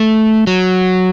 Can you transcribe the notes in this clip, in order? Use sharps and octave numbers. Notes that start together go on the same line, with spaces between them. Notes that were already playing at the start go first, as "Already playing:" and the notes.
Already playing: A3
F#3